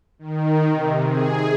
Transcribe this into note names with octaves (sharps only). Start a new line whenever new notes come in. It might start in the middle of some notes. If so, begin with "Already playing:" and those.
D#3
C3
G#4